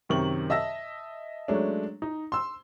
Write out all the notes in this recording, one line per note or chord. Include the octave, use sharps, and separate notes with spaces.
F#2 C3 D#3 C#6 F#7
D#5 E5 A5 E6 A#6
F#3 G#3 A3 C#4 D4
D#4
C6 E6